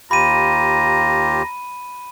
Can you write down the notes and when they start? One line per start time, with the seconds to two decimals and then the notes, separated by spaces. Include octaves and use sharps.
0.11 D#2 F4 G4 A#5 B5 D#7